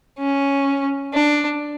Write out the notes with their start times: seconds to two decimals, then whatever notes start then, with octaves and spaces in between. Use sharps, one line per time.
0.19 C#4
1.13 D4